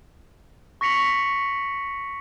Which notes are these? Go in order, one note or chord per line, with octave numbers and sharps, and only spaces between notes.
C#6 A#6 B6 C#7 F7 F#7